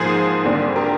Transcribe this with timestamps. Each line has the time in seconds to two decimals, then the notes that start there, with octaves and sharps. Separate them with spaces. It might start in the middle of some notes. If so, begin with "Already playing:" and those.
Already playing: G#2 F3 A#3 G#4 C5
0.45 F2 D3 G3 A#3
0.76 G4 A#4